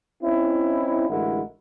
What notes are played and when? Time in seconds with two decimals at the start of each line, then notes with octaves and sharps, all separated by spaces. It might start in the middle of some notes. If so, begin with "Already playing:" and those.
0.23 C4 C#4 D#4 E4
1.09 A1 D3 G#3 E4 F#4 A#4